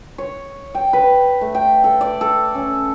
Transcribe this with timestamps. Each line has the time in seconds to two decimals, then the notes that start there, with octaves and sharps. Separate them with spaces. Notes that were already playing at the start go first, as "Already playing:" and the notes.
0.18 C#5
0.75 G5
0.93 B4
1.41 A3
1.55 G5
1.84 A4
2.01 D5
2.21 A4
2.55 C#4